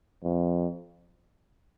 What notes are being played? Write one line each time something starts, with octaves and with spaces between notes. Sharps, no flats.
F2